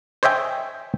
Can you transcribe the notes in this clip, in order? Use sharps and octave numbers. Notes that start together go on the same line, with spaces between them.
C5 C#5 D#5 E5 G5 G#5